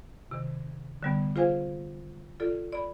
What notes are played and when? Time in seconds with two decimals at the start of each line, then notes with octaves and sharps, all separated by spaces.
0.31 C3 D#3
1.03 D3 G3 B3
1.36 F4 G#4 C5 F5 G#5
2.40 F4 A4 D5
2.72 D5 B5